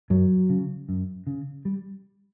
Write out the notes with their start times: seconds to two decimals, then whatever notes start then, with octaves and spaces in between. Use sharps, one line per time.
0.10 F#2 F#3
0.49 C#3
0.89 F#2
1.27 C#3
1.65 G3